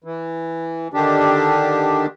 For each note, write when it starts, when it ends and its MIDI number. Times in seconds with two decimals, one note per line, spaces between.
0.04 0.88 52
0.94 2.06 50
0.94 2.06 51
0.94 2.06 62
0.94 2.06 67